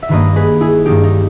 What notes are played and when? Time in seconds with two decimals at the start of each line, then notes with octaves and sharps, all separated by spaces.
0.02 E5
0.09 G2 D#3 A#3 B4 D#5
0.36 G#4 B4
0.61 E4 G#4
0.85 G2 D#3 A#3 D#4 G4
1.04 D#4